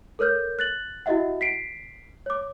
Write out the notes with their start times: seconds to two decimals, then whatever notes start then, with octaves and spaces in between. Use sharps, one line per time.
0.19 A4 A#4 C#5 F6 G6
0.59 F#6 A6 F#7
1.06 E4 F#4 G4 D#5 E5 F#5
1.41 B6 C7 D7
2.26 C#5 D6